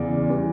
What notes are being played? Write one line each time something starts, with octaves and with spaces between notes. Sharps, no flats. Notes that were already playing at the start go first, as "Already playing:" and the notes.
Already playing: E2 C#3 E3 D5
E3 G3